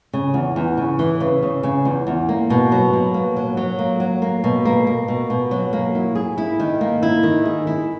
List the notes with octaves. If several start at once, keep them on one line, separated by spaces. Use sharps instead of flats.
C#3
E2
E2
C#3
E3
C#3
C#3
C#3
E2
E2
A#3
B2
F#3
B2
A#3
F#3
F#3
A#3
F#3
A#3
B2
A#3
A#3
B2
B2
F#3
A#3
E4
G#4
E4
D#3
A#3
E4
D#3
G#4
E4